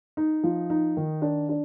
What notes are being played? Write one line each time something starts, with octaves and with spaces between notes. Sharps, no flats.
D#4
F3
D#4
D#3
D4
D4